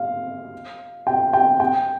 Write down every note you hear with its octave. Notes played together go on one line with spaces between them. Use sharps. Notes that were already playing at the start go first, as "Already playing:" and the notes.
Already playing: F5
G5
G5
G5